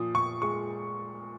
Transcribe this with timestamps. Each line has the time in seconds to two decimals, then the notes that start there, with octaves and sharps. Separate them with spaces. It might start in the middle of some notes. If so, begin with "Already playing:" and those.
Already playing: A#2 F3 D#6
0.15 A#2 C#6
0.42 G#3 C#6